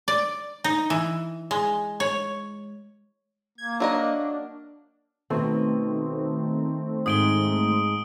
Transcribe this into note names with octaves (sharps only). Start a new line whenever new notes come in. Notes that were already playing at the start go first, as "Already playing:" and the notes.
D5
D#4
E3
G#3
C#5
A#3 G#6
F#3 D4 A#4 D#5
B2 D#3 A3 C4
G#2 D#6 D7 G7